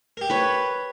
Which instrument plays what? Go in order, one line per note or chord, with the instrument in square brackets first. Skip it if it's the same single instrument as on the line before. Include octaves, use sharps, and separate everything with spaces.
[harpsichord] G4 A#4
[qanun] B4 C#5